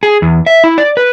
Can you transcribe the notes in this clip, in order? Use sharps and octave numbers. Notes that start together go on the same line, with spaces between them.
G#4
E2
E5
E4
D5
B4